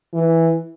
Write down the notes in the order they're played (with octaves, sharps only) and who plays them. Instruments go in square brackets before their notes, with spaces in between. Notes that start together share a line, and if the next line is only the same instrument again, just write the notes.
[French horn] E3